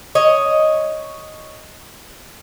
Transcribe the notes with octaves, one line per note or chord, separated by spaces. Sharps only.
C#5 D#5